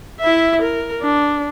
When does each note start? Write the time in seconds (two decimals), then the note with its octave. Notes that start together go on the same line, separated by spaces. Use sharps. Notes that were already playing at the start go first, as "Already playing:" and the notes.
0.20 E4 E5
0.62 A#4
1.02 D4